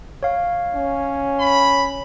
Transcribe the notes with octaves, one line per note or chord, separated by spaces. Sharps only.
C#5 F5
C#4
B5